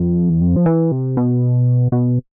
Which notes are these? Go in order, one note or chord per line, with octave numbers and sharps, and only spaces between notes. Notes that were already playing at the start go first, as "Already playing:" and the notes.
Already playing: F2
E2
F2
F3
E3
C3
B2
B2